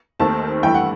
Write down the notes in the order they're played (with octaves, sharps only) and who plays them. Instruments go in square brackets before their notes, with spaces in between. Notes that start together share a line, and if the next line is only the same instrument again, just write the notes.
[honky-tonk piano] D#2 D#3 A3 C4 [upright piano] A5
[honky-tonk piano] G2 E3 A3 E4 [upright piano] G5
[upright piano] F#5